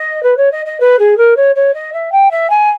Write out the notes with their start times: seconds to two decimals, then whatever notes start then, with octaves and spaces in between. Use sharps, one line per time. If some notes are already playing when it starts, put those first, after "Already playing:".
Already playing: D#5
0.23 B4
0.37 C#5
0.52 D#5
0.66 D#5
0.80 B4
0.99 G#4
1.17 A#4
1.37 C#5
1.56 C#5
1.74 D#5
1.93 E5
2.12 G5
2.31 E5
2.50 G#5